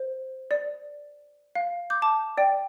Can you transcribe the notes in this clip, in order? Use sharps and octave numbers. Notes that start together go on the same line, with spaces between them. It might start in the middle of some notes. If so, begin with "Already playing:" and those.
Already playing: C5
D5
F5
D6 G6
A5 D6
D5 G5